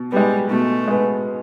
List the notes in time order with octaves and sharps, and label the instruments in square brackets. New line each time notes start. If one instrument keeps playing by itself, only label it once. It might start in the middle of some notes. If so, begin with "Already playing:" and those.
Already playing: [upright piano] B2
[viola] G3 [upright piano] G#3 B3
[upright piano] B2 [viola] A3
[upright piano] G#3 B3